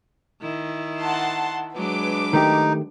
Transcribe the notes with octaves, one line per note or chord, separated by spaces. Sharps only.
D#3 E4
F#5 A5 C6
F#3 G#3 D4 B4 D6
D#3 A3 D#4 G4